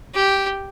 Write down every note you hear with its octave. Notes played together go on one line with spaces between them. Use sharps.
G4